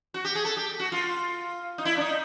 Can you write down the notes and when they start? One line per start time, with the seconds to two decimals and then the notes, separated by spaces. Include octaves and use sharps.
0.14 F#4
0.25 G4
0.35 G#4
0.45 A4
0.57 G4
0.80 F#4
0.92 F4
1.78 D#4
1.85 E4
1.97 D4
2.01 D#4